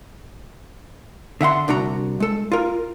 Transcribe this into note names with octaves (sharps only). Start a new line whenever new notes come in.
D3 E5 F#5 C6
C2 D4 F#4 A#5
G#3 A4
F4 A#4